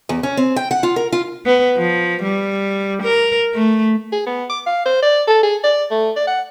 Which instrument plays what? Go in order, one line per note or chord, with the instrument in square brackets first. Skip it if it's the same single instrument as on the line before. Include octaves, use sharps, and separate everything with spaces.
[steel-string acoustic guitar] E2
C#4
C4
G5
F#5
F4
A#4
F4
[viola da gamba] B3
F3
G3
A#4
A3
[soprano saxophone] G#4
B3
D6
F5
C5
D5
A4
G#4
D5
A3
D5
F#5